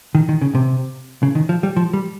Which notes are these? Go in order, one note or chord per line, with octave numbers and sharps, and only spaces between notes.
D#3
D#3
C#3
C3
C#3
D#3
F3
G3
F3
G3